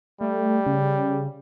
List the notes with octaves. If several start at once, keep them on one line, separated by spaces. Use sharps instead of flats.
G3 A3
C#3